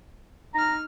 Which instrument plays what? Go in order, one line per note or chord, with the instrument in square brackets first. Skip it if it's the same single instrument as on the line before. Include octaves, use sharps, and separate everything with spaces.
[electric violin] D#4 F6 [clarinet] A#5